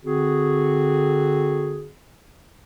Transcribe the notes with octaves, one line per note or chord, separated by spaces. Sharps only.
D3 C4 F#4 G#4